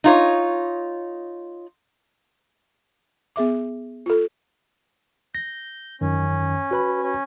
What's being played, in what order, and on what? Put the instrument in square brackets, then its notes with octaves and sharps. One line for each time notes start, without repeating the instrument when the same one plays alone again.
[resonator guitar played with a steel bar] D#4 F4 C#5
[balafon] B3 G#4 E5 D6
F4 A4
[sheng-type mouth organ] G6 [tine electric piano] A#6
[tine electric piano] F#2 D#3 [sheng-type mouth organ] C#4
[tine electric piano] F#4 B4 B5
[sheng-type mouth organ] C#4